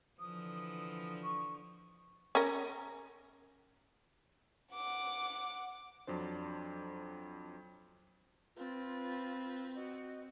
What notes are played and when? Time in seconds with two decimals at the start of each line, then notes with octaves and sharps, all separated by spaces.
0.20 D3 E3 F3 D#6
1.24 C#6
2.35 C#4 A#4
4.74 F#5 D6
6.07 F2 F#3 D4 C5
8.57 C4 F4 B4
9.75 F#4 D#5